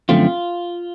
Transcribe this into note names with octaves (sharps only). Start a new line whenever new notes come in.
F#2 D3 F3 A3 C4 F4